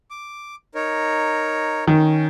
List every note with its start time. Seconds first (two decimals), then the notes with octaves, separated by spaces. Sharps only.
0.11 D6
0.75 D#4 A#4 C#5
1.87 D#3 C#4